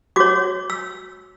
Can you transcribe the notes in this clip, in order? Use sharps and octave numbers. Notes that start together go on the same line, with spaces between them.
F#4 C#5 D6
E6